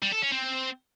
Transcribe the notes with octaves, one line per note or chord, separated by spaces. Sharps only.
G3
A4
C#4
C4